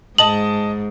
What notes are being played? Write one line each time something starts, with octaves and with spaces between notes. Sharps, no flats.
G#2 D#5 A5 D#6 F#7